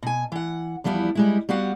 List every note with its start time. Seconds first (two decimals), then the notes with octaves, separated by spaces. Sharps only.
0.03 B2 G#5
0.32 E3 F#5
0.84 E2 F3 G3 B3 E4
1.15 G3 G#3 E4
1.49 G3 B3 F#4 F5 F#5